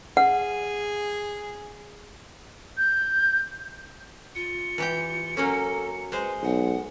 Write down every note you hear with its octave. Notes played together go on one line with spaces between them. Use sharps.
G#4 F#5
G6
F4 C#7
E3 G4 G5
F#3 A#3 C#4 A4
G#3 B4 C5
B1 F#5